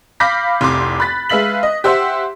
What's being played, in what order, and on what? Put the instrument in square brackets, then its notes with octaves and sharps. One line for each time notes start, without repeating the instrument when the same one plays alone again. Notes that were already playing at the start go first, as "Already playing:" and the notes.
[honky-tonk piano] F5 B5 D6 G6 A#6 B6
F1 C2 C6 D6
B5 F#6 A6 B6
G#3 B4 E5 F5 B6 F#7
D#5
G4 C5 E5 F#5 C6